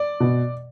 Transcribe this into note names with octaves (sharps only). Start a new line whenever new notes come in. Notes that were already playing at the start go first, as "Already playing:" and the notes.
Already playing: D5
B2